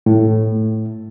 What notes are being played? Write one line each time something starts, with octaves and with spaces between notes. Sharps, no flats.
A2